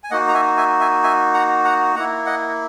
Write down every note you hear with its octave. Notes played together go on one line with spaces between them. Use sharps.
G#5
A#3 D#4 F#4 D#5 F#5
A#5
E5 G#5
E5 G#5
E5 G#5
E5 G#5
F#5 A#5
F#5 A#5
A#3 E4 F#5 A#5
D#5 F#5